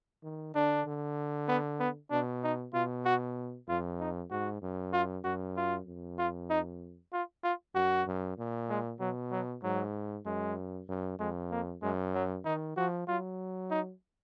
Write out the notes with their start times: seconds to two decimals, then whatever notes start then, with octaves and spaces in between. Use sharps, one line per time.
0.23 D#3
0.55 D3 D4
0.86 D3
1.48 B3
1.79 B3
2.11 B2 D4
2.43 D#4
2.74 B2 F4
3.05 F#4
3.68 F2 F4
4.00 D#4
4.30 G#2 F#4
4.62 F#2
4.93 F4
5.24 F#2 F#4
5.56 F4
5.87 F2
6.18 F4
6.50 D#4
7.13 F4
7.43 F4
7.75 F#2 F#4
8.07 F#2
8.38 A#2
8.69 G#3
9.00 B2 F#3
9.32 F#3
9.63 G#2 F#3
10.26 F#2 G#3
10.89 F#2
11.19 F2 G#3
11.51 A#3
11.82 F#2 G#3
12.14 F#3
12.45 D#3 D#4
12.77 F3 F#4
13.08 F#3 F4
13.70 D#4